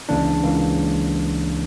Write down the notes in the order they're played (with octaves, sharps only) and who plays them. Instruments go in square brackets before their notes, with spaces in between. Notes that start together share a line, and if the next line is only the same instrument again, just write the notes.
[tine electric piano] C#2 C#3 E3 A#3 D4
C#2 C#3 E3 A#3